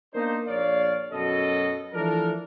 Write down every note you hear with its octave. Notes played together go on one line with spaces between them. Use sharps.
A#3 B3 D4 D#4 A#4 C5
A#1 C#5 D5 F5
F#2 B2 A4 D#5
E3 F3 A3 D4 A4 A#4